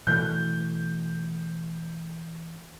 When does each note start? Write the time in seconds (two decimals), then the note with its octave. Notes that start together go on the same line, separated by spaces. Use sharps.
0.07 B2 E3 A3 G6